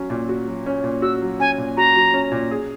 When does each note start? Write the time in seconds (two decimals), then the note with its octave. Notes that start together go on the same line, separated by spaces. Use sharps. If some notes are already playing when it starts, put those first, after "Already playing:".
Already playing: F#3 C#4
0.10 A#2
0.29 F#4
0.48 F#3
0.66 C#4
0.84 A#2
1.02 F#4 E6
1.22 F#3
1.39 C#4 G#5
1.58 A#2
1.77 F#4 A#5
1.96 F#3
2.14 C#4
2.32 A#2
2.51 G#4